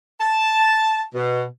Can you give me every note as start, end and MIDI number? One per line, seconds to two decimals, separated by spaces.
0.21 1.01 81
1.15 1.44 47